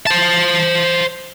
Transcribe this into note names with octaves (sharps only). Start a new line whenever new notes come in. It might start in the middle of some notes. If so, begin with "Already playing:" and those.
C5 A5